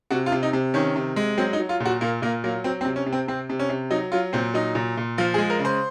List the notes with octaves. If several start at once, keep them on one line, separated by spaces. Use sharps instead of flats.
C3 F#4
F4
C3
D#4
C3
D#3 C#4
C3
G#3
F#3 C4
D#4
F#3
F4
A#2
F#4
A#2 A#3
A#2 A#3
F#3 A#3
F#3 C4
C4
C3
C#4
C3
C4
C3 C4
C3
C#4
C3
F#3 D#4
F#3 F4
A#2 C4
F#3 D#4
A#2
A#2
F3 F4
G#4
G#3
A#4
C#3
C5